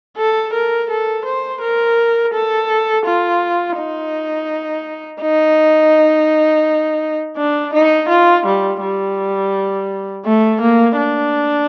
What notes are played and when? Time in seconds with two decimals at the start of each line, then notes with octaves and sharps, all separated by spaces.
0.17 A4
0.53 A#4
0.89 A4
1.25 C5
1.61 A#4
2.33 A4
3.05 F4
3.77 D#4
5.21 D#4
7.37 D4
7.73 D#4
8.09 F4
8.45 G3
8.82 G3
10.25 A3
10.61 A#3
10.97 D4